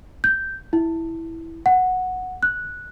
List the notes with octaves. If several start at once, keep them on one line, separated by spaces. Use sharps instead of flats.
G6
E4
F#5
F#6